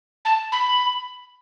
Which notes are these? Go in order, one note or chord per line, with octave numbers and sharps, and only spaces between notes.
A5
B5